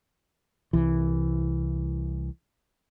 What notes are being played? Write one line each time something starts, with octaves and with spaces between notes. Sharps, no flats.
C2 E3